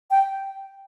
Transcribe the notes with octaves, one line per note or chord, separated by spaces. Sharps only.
G5